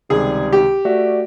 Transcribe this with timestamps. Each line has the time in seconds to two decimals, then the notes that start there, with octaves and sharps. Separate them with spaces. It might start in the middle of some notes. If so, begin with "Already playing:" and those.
0.10 C#2 C3 D#3 G3 G#4
0.53 G4
0.85 A3 F#4 D5 E5